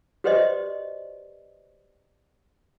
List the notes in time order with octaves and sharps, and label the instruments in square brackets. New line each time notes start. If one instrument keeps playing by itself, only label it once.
[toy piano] F#4 G4 B4 C5 D5 D#5